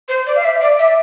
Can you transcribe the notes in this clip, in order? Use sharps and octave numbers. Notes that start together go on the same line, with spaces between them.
C5
D5
F5
E5
D5
E5